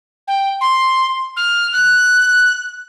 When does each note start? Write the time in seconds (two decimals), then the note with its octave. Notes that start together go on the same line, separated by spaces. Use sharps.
0.27 G5
0.60 C6
1.36 F6
1.72 F#6